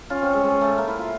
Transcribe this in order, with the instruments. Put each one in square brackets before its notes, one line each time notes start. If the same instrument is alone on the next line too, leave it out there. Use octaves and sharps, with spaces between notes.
[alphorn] C#4 [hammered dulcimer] F4
[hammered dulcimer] C4
G#3
G#3
A3
A#3
E4
F4